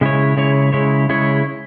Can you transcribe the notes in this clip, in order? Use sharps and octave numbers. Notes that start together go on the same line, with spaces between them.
C#3 G#3 E4 C#5
C#3 G#3 E4 C#5
C#3 G#3 E4 C#5
C#3 G#3 E4 C#5